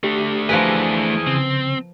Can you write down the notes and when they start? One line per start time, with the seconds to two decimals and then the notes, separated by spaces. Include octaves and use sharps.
0.04 A3 D4 G4
0.49 E3 F3 G#4 A#4 B4
1.27 C#3 C4